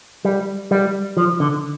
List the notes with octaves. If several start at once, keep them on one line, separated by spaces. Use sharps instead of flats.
G3
G3
F3
D3